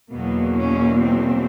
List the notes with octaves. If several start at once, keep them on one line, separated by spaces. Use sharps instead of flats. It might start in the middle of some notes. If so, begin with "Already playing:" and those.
E2 B2 F#3 A#3 B3
C#4
C4